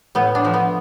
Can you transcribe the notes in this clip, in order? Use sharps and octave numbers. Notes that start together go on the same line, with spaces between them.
A2 B3
D4
F3 A3
B3